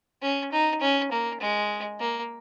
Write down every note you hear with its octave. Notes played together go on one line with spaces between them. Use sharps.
C#4
D#4
C#4
A#3
G#3
A#3